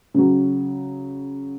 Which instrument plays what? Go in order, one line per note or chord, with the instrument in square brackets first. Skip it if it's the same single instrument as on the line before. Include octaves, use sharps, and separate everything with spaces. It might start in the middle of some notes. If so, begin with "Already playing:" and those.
[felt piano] C#3 F#3